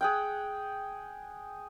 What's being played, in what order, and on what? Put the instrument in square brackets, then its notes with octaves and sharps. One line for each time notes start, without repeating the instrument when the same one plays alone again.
[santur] G#4 F#5 G5